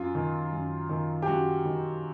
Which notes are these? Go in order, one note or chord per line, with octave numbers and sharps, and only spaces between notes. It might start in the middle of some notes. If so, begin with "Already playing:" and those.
Already playing: F#2 F4
D#3
F#2
D#3
G4
F#2 F#4
D#3